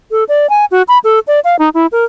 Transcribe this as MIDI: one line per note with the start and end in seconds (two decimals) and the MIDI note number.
0.11 0.24 69
0.29 0.49 74
0.50 0.65 80
0.71 0.82 66
0.88 0.98 83
1.04 1.20 69
1.27 1.40 74
1.44 1.56 77
1.59 1.69 63
1.74 1.87 64
1.92 2.05 70